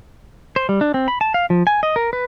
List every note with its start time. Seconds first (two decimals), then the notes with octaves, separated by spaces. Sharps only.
0.56 C5
0.69 G3
0.81 D4
0.94 C4
1.08 B5
1.21 A5
1.34 F5
1.50 F3
1.67 G#5
1.83 D#5
1.96 A#4
2.13 B4